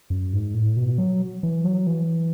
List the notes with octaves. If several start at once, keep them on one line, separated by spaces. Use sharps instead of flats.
F#2
G#2
A2
B2
F#3
E3
F#3
E3